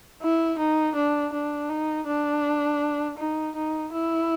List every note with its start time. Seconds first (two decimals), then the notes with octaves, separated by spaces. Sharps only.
0.22 E4
0.59 D#4
0.95 D4
1.33 D4
1.69 D#4
2.07 D4
3.18 D#4
3.55 D#4
3.92 E4